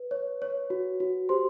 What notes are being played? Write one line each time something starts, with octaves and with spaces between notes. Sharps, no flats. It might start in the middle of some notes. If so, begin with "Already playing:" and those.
Already playing: B4
C#5
C#5
F#4
F#4
G4 C5 C6